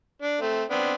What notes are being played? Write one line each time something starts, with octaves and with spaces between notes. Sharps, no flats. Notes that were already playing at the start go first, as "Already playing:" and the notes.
D4
A3 C4
B3 C4 D4